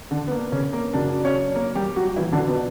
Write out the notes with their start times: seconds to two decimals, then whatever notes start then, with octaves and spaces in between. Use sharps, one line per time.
0.11 D3 D4
0.27 B3
0.31 A#3
0.52 C#3 C#4
0.73 A#3 A#4
0.93 F#2 C#3 F#3 D4 D5
1.24 C#4 C#5
1.55 A#3 A#4
1.75 G3 G4
1.96 F#3 F#4
2.16 A#2 E3 F#3 E4
2.32 D3 D4
2.48 B2 B3